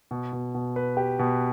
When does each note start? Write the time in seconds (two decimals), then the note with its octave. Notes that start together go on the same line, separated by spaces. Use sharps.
0.11 B2
0.33 B2
0.55 B2
0.76 B4
0.97 G4
1.19 B2